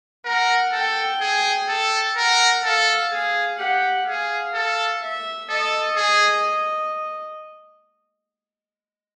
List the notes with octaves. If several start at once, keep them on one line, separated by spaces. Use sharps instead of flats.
A#4 F#5
A4 G5
G#4
A4
A#4 F#5
A4 F5
G#4
G4 F#5
G#4 F5
A4
E5
A4 D#5
G#4